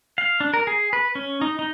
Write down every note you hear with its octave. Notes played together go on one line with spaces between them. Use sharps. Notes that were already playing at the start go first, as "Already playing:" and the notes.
F5
D4
A#4
G#4
B4
C#4
D#4
D#4